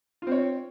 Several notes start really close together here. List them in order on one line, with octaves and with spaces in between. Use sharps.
F4 C4 C#5